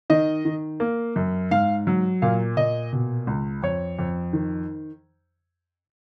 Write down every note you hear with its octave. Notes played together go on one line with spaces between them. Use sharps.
D#3 D#5
D#3
A#3
F#2
G#2 F5
F#3
A#2 F5
A#2 D#5
B2
C#2
F2 C#5
F2
D#3